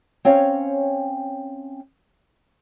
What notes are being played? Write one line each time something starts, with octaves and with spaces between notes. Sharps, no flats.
C4 C#4 C#5 F5